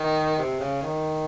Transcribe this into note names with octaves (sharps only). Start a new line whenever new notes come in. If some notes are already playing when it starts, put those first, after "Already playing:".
Already playing: D#3
C3
C#3
D#3